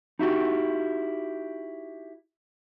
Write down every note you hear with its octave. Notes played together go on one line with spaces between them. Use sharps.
D#4 E4 F#4 G4